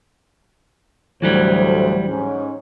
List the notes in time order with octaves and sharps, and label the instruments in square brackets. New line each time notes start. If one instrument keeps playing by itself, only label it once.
[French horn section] D2 A2 C5 [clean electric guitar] E3 F#3 G3
[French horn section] G#2 C#4